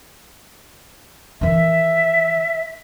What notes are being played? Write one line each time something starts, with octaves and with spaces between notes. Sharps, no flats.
D#3 E3 E5